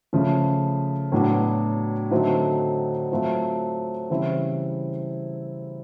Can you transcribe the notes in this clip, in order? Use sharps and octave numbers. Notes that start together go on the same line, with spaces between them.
C#3 F3 A3
A2 F#3 B3 D4 F#4
D3 F#3 A3 C4 D#4
F#3 A3 C4 F4
C#3 E3 G3 C4 E4